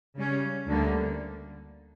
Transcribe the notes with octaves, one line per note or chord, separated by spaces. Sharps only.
C#3 G3 C#4
D2 D3 G3 A#3